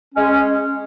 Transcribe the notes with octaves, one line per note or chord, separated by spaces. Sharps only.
G#3 C#4